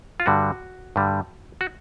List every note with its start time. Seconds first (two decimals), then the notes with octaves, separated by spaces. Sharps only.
0.20 F4
0.26 G2 D3 G3 F#4
0.96 G2 D3 G3
1.61 F#4